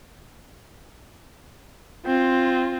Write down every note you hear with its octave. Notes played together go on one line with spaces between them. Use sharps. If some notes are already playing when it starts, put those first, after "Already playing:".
C4 F4